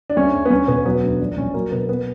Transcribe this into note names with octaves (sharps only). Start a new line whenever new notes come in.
D4
D2 C#4
D2
B3
D2 C#4
E1 B3
F#3 B3
D2
A#1 D4
A#1 C#4
F#3 A#3
B2 B3
B3